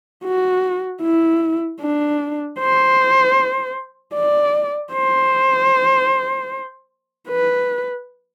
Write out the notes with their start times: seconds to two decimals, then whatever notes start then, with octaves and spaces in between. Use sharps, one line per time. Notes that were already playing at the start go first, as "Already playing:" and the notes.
0.24 F#4
1.01 E4
1.81 D4
2.59 C5
4.14 D5
4.93 C5
7.28 B4